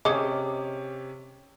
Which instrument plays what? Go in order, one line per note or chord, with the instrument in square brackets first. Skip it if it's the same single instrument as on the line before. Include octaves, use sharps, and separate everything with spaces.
[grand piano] C3 C#4 [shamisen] G#4 C#5 D#5 [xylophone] D6